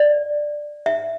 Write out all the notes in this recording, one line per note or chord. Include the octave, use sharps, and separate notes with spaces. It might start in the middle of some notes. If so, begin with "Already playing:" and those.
Already playing: D5
E5